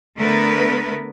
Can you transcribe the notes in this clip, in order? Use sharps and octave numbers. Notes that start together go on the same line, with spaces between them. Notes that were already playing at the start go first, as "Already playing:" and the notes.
D3 A3 B3 A#4 B4